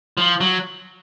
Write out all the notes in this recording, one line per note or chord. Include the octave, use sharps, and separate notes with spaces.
F3
F#3